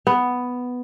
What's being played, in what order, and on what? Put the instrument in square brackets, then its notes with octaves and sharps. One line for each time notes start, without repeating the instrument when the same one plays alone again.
[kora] B3